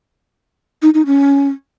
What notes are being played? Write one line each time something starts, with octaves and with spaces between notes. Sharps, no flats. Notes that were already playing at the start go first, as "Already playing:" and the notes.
D#4
D#4
C#4